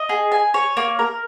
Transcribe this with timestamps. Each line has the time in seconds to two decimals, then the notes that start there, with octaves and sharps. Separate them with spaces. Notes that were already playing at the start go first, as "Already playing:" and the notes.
Already playing: D#5
0.09 G#4
0.32 G#5
0.54 C#5
0.77 A#3
0.99 A#4